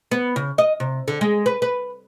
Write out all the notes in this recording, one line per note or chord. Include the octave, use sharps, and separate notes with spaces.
B3
C#3
D#5
C3
D3
G#3
B4
B4